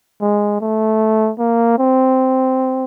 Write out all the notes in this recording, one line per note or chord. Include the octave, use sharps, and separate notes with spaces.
G#3
A3
A#3
C4